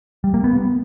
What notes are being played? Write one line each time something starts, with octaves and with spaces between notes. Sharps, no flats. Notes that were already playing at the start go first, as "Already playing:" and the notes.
G3
A#3
B3